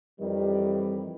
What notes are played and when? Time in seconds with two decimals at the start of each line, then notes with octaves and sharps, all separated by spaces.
0.20 F2 D#3 E3 G3